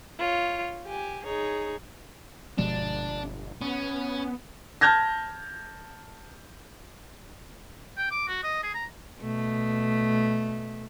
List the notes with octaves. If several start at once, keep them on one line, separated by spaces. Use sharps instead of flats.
F4 C#5
G4 G#5
D#4 G#4 C#5
G1 B2 F3 G#3 D4
B3 C#4
A5 F6 G6 G#6 A#6
G5
D6
F#4
D#5
G#4
A#5
B2 A3